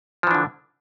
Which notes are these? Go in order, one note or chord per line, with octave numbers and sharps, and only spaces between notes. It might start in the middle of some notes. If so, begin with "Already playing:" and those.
D3 E3 F3 D4